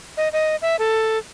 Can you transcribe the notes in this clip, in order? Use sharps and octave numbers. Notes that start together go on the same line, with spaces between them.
D#5
D#5
E5
A4